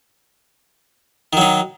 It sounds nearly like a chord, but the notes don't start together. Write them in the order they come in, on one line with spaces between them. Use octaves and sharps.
D#3 F#3 D#4